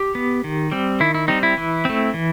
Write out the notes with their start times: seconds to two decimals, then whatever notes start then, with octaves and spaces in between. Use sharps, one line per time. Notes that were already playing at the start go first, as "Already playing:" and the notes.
Already playing: G4
0.15 B3
0.44 D#3
0.72 G3 C4
1.00 D#3 E4
1.15 E4
1.28 G3 C4 D#4
1.43 E4
1.57 E3
1.85 A3 C4
2.14 E3